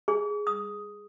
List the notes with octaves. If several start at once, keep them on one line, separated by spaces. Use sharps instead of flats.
G#4
D#6